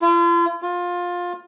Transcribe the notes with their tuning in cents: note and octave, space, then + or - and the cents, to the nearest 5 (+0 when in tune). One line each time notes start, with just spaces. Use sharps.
F4 -40
F4 +20